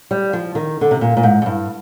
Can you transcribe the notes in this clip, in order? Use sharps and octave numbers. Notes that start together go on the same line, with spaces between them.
G3
F3
D#3
D3
C3
A#2
A#2
G#2
G#2
G2